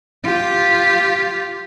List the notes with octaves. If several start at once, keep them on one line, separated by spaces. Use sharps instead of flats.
F4 G4